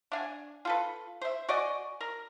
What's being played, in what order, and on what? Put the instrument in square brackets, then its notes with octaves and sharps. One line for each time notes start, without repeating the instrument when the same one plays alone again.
[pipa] D4 F5 G#5
F4 A4 B4
C5 E5
F#4 D5 D#5 G#5
A#4